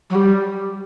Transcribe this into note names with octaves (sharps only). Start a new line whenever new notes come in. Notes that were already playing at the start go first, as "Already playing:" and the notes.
F#3
G3